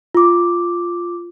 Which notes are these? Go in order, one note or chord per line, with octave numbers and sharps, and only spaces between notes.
F4 D6